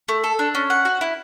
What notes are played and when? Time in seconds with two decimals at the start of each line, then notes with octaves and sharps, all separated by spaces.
0.08 A3
0.24 A4
0.39 D4
0.55 C#4
0.70 F#5
0.85 F#4
1.01 E4